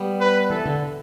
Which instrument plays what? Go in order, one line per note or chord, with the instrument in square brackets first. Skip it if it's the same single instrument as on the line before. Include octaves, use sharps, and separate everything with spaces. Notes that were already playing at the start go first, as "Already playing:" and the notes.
Already playing: [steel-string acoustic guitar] G3 B3
[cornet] B4
[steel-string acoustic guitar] E3 [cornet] A4
[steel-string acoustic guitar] D3